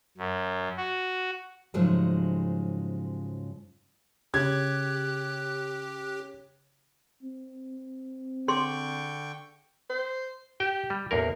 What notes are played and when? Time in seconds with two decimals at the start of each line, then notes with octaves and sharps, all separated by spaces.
0.18 F#2
0.77 F#4
1.74 G#2 C#3 F3 F#3 G#3 A3
4.34 C#3 G4 F#6 G#6
7.23 C4
8.48 D3 G#4 G5 C6 C#6
9.90 C5
10.60 G4 G5
10.90 G3
11.11 A1 E2 A#3 A#4